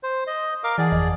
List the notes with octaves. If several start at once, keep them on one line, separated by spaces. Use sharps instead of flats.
C5
D#5
A#4 F5 D6
E3 G#4 D5 F#5 A5
G1 F2 D#5